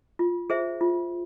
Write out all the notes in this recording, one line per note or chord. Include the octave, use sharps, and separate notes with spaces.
F4
G#4 C5 E5
F4